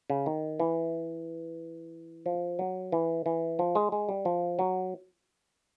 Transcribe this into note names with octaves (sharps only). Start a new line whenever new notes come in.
C#3
D#3
E3
F3
F#3
E3
E3
F3
G#3
G#3
G3
F3
F#3